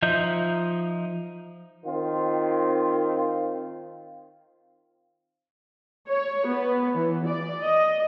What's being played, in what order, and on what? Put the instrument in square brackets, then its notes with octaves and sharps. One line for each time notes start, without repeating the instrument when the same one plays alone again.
[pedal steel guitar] F3 D#4 D#5 E5 G6
[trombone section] D#3 C4 F4
[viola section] C#5
B3
E3
D5
D#5